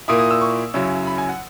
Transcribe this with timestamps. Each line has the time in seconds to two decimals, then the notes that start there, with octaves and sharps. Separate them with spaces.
0.08 A#2 A#3 E4 D#6
0.19 D#6
0.31 E6
0.41 C#6
0.74 F#2 C#3 F#3 C#4 E4
1.07 B5
1.18 G#5
1.29 F#5